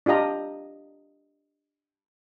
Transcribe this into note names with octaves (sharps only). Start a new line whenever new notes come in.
D4 F4 G4 D#5 A#5